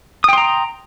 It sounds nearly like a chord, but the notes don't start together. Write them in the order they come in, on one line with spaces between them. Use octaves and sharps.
D#6 G5 C6 A#5